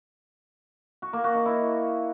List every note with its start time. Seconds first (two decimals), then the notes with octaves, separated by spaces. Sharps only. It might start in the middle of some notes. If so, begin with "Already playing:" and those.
1.02 F#4
1.13 A#3
1.24 F#4
1.35 D#4
1.46 E4